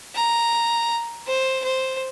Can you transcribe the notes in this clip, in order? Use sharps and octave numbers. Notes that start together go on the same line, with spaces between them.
A#5
C5
C5